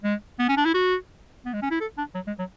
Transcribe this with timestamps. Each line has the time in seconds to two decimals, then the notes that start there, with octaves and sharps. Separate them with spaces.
0.04 G#3
0.39 B3
0.48 C#4
0.57 D4
0.65 E4
0.74 F#4
1.45 B3
1.53 G#3
1.62 C#4
1.71 E4
1.80 A4
1.98 D4
2.14 F#3
2.27 G#3
2.39 F#3